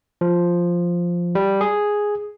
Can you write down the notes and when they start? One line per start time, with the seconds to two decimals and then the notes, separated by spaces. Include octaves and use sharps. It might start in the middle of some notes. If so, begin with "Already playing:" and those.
0.21 F3
1.35 G3
1.61 G#4